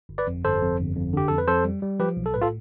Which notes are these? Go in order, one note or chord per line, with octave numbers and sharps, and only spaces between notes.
G1
B4 D5
F2
G1 A4 C5
F2
G1
F2
D3 G4
F2 A4
B4
F2 A4 C5
G3
G3
F3 G4 B4
B1
A4
A2 B4
F4 A4